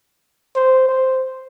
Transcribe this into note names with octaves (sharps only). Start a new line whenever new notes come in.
C5
C5